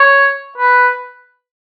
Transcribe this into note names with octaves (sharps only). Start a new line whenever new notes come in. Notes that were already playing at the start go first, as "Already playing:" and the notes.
Already playing: C#5
B4